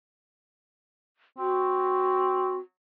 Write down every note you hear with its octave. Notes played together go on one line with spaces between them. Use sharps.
C4 F#4